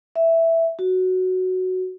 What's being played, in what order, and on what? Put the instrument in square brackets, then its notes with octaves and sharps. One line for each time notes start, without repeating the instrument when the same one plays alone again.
[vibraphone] E5
F#4